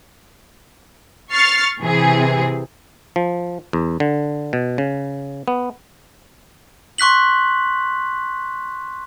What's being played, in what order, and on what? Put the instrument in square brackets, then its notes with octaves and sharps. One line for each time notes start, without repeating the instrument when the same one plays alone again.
[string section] C#6 F6 A6 C7 C#7
C3 E3 C4 G#4
[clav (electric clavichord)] F3
E2
D3
B2
C#3
B3
[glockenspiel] C6 C#6 F#6 B6 F#7